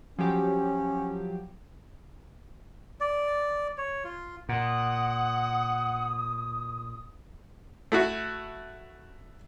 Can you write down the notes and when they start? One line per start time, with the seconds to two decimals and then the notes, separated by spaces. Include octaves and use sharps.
0.19 F3 F#3 C#4 G4
3.01 D5
3.78 C#5
4.04 F4
4.49 A#2 F#5 D#6
7.92 A3 E4 F#4